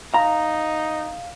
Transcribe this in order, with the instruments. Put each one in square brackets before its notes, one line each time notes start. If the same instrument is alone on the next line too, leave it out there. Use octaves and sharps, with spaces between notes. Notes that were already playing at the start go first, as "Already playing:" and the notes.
[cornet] D#4 [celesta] F5 [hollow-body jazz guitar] A#5